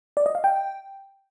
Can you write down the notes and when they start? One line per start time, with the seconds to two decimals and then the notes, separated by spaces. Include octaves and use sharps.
0.17 D5
0.26 D#5
0.35 F5
0.44 G5